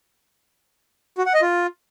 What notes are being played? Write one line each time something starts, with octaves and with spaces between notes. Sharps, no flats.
F#4
F#5
D#5
F4